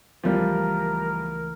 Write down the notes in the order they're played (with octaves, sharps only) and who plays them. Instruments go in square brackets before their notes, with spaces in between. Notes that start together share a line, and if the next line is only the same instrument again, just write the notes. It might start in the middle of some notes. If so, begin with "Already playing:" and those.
[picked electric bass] C#2 E3 A3 [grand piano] F3 G3 [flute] A#4